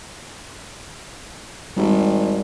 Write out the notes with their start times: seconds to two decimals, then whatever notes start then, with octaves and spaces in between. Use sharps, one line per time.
1.76 G#1 G3